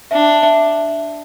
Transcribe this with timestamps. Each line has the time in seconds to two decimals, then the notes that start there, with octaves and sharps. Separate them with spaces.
0.11 D4 E5
0.42 E5